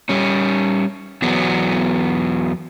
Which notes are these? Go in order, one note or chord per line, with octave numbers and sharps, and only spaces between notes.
G3 C#4
E2 F#3 B3